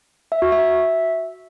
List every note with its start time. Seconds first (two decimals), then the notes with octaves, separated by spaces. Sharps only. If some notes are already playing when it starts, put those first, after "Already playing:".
0.32 E5
0.42 F#4
0.52 E5